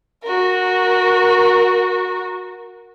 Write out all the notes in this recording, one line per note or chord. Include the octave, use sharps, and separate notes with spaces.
F#4 A#4